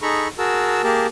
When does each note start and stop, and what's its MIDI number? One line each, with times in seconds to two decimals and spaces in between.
0.02 0.28 63
0.02 0.28 68
0.02 0.28 69
0.02 0.28 82
0.02 0.28 83
0.02 0.28 85
0.38 0.82 66
0.38 0.82 68
0.38 0.82 70
0.38 0.82 81
0.38 0.82 88
0.83 1.07 58
0.83 1.07 67
0.83 1.07 68
0.83 1.07 70
0.83 1.07 81